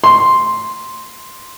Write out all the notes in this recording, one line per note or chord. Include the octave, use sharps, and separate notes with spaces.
C6